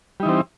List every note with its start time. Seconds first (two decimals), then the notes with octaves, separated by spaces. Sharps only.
0.20 G3
0.23 D#4
0.26 E3
0.29 C4